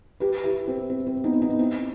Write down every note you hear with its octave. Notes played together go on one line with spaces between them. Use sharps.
G4 B4
E4 G4
C4
C4
C4
B3 D#4
B3 D#4
C4 E4